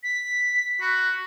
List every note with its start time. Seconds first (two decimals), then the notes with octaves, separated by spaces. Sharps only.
0.03 B6
0.81 F#4 B5